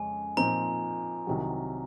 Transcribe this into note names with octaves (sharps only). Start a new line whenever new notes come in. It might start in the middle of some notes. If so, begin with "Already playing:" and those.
Already playing: F2 C#3 G#3 C#4 G#5
A#2 F3 C4 D#4 A#5
C2 C3 D#3 F#3